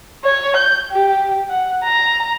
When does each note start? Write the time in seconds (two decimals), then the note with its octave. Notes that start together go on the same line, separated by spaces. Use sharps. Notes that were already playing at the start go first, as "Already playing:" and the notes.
0.25 C#5
0.57 G6
0.92 G4
1.49 F#5
1.84 A#5